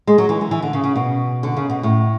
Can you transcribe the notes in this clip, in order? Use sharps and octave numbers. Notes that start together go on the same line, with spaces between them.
G#3
F#3
E3
E3
E3
D3
C#3
C#3
B2
D3
C#3
B2
A2